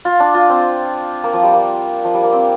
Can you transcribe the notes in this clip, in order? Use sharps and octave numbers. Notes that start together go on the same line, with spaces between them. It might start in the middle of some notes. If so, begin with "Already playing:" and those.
F4
D4
F4
C4
A#3
F3
G3
A#3
F3
G3
A#3
C4